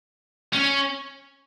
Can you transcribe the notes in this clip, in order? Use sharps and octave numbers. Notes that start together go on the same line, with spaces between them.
C#4